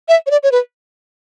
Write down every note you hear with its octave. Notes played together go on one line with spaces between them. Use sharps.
E5
C#5
D5
C#5
B4